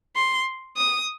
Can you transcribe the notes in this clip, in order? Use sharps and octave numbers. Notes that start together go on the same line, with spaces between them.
C6
D#6